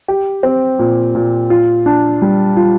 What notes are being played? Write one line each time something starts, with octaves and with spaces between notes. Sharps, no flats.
G4
C4
A#2
A#2
F4
D4
G3
F4